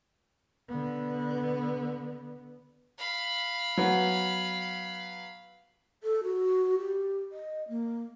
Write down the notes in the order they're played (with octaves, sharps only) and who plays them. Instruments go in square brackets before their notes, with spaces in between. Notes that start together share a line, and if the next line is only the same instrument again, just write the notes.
[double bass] D3 B3
[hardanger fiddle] F5 B5
[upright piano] F#3 B3
[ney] A4
F#4
G4
D#5
A#3